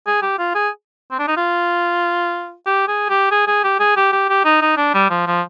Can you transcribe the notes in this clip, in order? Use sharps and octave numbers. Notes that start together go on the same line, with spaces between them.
G#4
G4
F4
G#4
C4
D4
D#4
F4
G4
G#4
G4
G#4
G#4
G4
G#4
G4
G4
G4
D#4
D#4
D4
G3
F3
F3